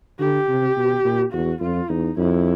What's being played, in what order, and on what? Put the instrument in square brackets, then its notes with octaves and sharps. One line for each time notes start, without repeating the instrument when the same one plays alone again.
[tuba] D3 [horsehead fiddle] G4
[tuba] C3
B2
A#2
[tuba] E2 [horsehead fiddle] F#4
[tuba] F2 [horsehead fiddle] F4
[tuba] E2 [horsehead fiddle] D#4
[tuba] F2 [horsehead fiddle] E4